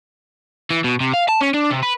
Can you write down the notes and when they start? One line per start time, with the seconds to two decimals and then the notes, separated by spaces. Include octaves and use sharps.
0.71 E3
0.84 B2
1.00 C3
1.14 F5
1.29 A5
1.41 C#4
1.54 D4
1.71 C3
1.83 B4